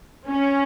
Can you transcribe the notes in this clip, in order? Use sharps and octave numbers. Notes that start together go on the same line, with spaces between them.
C#4